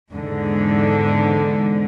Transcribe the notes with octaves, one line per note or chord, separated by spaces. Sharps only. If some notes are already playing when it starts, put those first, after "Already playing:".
E2 G#2 D3